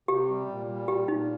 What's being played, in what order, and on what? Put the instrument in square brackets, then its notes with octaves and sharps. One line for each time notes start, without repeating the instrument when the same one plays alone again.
[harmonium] C3 [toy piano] G4
[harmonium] G3
A#2
G3
[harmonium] A#2 [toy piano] G4
[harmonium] A#2 [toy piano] D#4